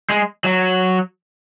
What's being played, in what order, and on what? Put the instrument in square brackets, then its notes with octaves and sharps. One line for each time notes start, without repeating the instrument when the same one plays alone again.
[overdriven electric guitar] G#3
F#3